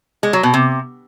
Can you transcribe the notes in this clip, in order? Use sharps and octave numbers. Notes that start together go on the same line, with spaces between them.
G#3
F#3
B2
C3